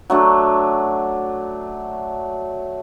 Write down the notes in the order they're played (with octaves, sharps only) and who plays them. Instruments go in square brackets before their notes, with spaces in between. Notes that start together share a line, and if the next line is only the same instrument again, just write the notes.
[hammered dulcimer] F#3 A3 D4